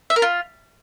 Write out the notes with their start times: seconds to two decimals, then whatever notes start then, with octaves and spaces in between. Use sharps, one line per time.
0.10 E5
0.16 A#4
0.22 F4